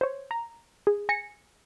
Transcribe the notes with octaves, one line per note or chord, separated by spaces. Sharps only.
C5 C#5
A#5
G#4
G#5 A#6 C#7